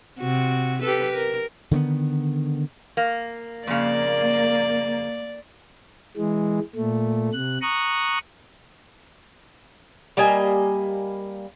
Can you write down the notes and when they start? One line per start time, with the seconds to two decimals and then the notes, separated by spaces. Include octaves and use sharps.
0.20 C3 F#4
0.83 G4 A4 B4
1.13 A#4
1.71 D3 D#3 A3 B3
2.97 A#3
3.67 F2 C#3 A#3 D5
6.17 E3 G#3
6.75 A#2 A3
7.33 C3 F#6
7.62 A#5 C#6 D#6 F#6
10.17 G3 A#3 D#5 G#5